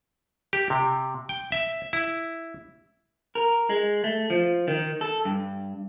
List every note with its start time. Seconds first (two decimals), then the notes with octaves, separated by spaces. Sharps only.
0.53 G4
0.70 C3
1.29 G5
1.52 E5
1.93 E4
3.35 A#4
3.70 G#3
4.04 A3
4.30 F3
4.68 D#3
5.01 A4
5.25 G2